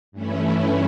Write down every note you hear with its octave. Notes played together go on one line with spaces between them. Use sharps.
G2 E3 A3 C#4 E4